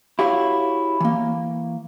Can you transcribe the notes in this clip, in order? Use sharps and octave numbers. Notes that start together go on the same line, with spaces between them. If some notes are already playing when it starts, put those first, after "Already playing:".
E4 F#4 G4 C#5 E5 F5
E3 A#3